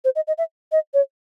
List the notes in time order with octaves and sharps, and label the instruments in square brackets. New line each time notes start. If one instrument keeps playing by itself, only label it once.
[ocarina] C5
D#5
D#5
E5
D#5
C#5